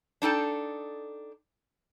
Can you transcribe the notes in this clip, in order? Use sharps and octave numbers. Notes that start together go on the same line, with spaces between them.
D4 D#4 A4 G5